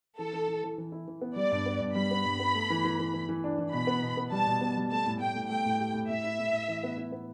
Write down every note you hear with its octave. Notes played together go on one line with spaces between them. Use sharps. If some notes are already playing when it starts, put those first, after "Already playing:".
E3 A4
E3
E3
E3
E3
E4
E3
B3
G3 D5
G2
B3
G2
G3 B5
B3
G2
B3
A3
E3
E3
E3
E3
E3
D4
E3
B2 B5
B3
B2
B3
G3 A5
B2
B3
G3
A3 A5
A2
A2 G5
A2
A3 G5
A2
G4
A2
A2 E5
E4
A2
A2
E3
B3
E4
B3